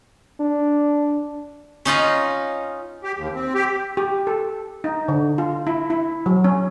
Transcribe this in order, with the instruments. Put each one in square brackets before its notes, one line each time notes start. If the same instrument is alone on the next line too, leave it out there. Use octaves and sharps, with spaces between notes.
[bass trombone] D4
[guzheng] C#4 D#4 F4 D#5
[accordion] G4
D#2
C4
G4
[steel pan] G4
A4
D#4
D3
F4
E4
E4
F#3
C#4